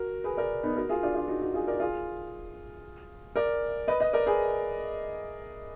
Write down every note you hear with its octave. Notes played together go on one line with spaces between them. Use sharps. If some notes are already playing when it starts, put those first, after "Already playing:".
Already playing: F#4 A#4
G#4 B4
A#4 D5
B3 D#4
F#4 A#4
F4 G#4
D4 F4
D4 F4
D#4 F#4
D#4 F#4
F4 G#4
A#4 D5
F4 G#4
A#4 D5
B4 D#5
B4 D#5
A#4 D5
G#4 B4